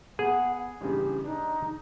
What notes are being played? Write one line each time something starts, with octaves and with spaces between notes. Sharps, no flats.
B3 G#4 F#5
A1 G2 C#3 G4
D4 D#4